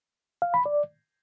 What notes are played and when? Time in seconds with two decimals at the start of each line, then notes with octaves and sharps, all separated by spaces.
0.42 F5
0.54 B5
0.66 D5